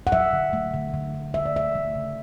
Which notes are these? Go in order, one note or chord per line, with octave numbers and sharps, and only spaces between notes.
F#5
F#3 E5
D3
A3
D3
D3
D3
A3 E5
D5
D3 E5
A3
C#3